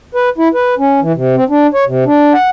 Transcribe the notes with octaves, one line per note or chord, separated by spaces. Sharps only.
B4
E4
B4
C#4
E3
C3
C4
D4
C#5
C3
D4
F#5